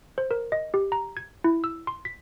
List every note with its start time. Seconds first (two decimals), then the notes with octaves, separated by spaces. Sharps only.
0.18 C5
0.31 A#4
0.52 D#5
0.74 G4
0.92 A#5
1.17 G#6
1.44 E4
1.64 E6
1.87 C6
2.05 B6